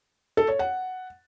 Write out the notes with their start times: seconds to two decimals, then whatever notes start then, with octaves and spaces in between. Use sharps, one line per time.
0.37 A4
0.48 C#5
0.59 F#5